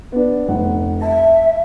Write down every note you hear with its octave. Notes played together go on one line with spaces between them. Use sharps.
B3 D4
F1 F#5
E5 A5